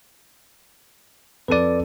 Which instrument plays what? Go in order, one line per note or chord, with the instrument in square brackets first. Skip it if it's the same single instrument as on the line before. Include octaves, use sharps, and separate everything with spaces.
[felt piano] F2 A4 D#7 [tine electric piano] B4 D5